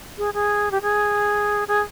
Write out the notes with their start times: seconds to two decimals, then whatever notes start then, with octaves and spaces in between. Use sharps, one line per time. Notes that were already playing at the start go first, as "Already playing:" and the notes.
0.18 G#4
0.34 G#4
0.72 G4
0.82 G#4
1.68 G#4